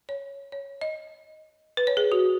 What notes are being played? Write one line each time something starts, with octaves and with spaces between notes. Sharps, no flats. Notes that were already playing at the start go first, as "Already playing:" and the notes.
C#5
C#5
D#5
B4
C#5
G#4
F#4